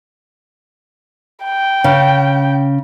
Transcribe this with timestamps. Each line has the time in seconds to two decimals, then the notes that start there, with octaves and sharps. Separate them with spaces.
1.44 G5
1.84 C#3